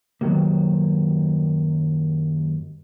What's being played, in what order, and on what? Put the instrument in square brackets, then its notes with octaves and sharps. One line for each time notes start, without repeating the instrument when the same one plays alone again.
[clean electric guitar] F#2 A2 D#3 F#3 G3 A#3